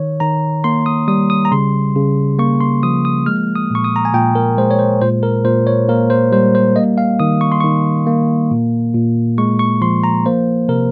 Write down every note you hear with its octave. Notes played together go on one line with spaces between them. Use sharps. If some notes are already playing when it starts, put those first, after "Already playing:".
Already playing: D#3 C#5
D#3 A#5
A#3 C6
D#6
G3 D#6
D#6
A#5
C#3 C6
C#3
A#3 C#6
C6
F3 D#6
D#6
G#3 F6
D#6
A#2 C#6
D#6
A#5
G#5
A#2 G5
A#4
G#3 C5
C#5
C5
A#2 C5
A#4
A#2 C5
C#5
A#3 A#4
C5
G3 C5
C5
A#3 D#5
F5
D#3 D#6
C#6
C6
D#3 C#6
A#3
A#2
A#2
G#3 C#6
C#6
F3 C6
A#5
A#3 C5
C3 A#4